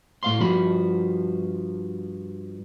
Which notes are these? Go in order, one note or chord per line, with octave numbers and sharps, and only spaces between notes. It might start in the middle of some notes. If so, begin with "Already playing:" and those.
A2 F5 C6
G2 F3 F#4 B5